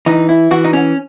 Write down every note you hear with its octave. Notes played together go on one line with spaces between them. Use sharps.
E3 D#4
E4
E3 F#4
D#4
C#4